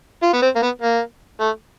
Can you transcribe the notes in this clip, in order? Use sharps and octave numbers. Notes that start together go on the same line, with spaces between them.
F4
B3
C4
A#3
B3
A#3
A3